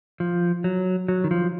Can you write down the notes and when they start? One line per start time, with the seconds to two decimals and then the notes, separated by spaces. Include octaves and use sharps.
0.20 F3
0.64 F#3
1.08 F#3
1.24 D#3
1.31 F3